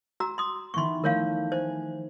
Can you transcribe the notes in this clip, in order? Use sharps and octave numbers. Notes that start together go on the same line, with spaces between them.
F#4 A#5 E6
C6 D#6
D#3 E3 B3 C6 C#6
D#3 F3 A3 A#4 C#5 F5
C5 G#5